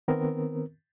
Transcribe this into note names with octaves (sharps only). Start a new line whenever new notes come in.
D#3 B3 C4 A#4